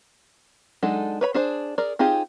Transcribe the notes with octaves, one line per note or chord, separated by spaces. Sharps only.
F#3 G#3 D4 D#4 A4
B4 C#5 B5
D4 G#4 C5
G#4 A#4 D5
C4 D#4 F4 G4 G#4